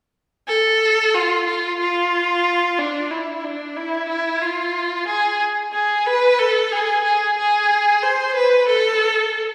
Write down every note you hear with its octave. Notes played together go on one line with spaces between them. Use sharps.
A4
F4
F4
F4
D4
E4
D4
E4
E4
F4
G#4
G#4
B4
A4
G#4
G#4
G#4
C5
B4
A4